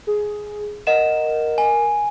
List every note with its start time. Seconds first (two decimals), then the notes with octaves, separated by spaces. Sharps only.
0.07 G#4
0.87 A#4 D#5 F#5 E7
1.58 G#5